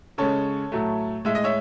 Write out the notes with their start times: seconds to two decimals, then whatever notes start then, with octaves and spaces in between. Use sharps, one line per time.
0.18 C#3 G#3 A4 C#5
0.72 A2 F#3 A3
1.25 A2 G#3 E5
1.35 D#5
1.44 C#5 E5